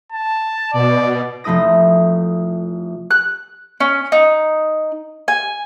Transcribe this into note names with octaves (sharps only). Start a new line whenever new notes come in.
A5
B2 D5
F1 F3 A3 E4 D#6 A#6
F#6
C#4
D#4
G#5